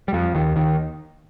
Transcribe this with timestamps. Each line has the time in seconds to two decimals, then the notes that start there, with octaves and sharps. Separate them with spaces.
0.08 G3
0.13 F2 F3
0.35 D#2 D#3
0.56 D#2 D#3